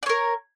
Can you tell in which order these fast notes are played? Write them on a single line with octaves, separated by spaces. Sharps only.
D5 C#5 A#4